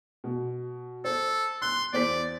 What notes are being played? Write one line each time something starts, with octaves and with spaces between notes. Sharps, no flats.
B2
A4 C5
C6 F#6
E2 C5 D5 B6